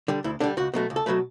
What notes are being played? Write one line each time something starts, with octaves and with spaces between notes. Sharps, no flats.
D3 G3
D2 E4
D3 G3 D4
C#2 F#4
B2 F#3 A3
C#2
A4
B2 F#3 A3 B4